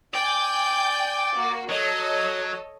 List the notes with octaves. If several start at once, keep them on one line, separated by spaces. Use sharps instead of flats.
D5 G5 G#5 G6
A#3 F#4
F#3 A4 C#5 D#5